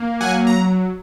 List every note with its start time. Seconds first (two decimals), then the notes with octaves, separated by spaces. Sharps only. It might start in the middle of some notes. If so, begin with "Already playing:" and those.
Already playing: A#3
0.21 F#3 F#5 G#5
0.47 A#5